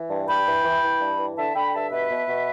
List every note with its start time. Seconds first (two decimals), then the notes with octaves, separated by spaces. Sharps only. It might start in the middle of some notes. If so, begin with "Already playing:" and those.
Already playing: E3
0.10 G2
0.28 G2 G5 B5
0.46 E3
0.65 E3
0.83 E3
1.01 G2
1.19 E3
1.37 D3 E5 A5
1.55 D3 G5 B5
1.73 G2 E5 A5
1.91 B2 B4 E5
2.10 B2
2.28 B2